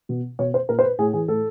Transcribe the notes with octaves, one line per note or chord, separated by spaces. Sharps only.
B2
B2 C#5
C5
A#2 A#4
C5
B4
A2 G#4
E3 G#4
A2 A4